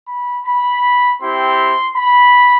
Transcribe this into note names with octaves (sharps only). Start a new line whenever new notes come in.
B5
B5
C4 E4 G4 C6
B5